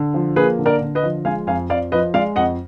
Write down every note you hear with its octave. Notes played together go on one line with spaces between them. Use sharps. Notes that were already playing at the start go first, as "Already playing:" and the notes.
Already playing: D3
F3
A#3 G#4 B4
D3
A#4 D5
D3
B4 D#5
F3
G#3 F5 G#5
F2 F5 G#5
F2 D5 F5
F3 B4 D#5
G#3 D5 F5
F2 D#5 F#5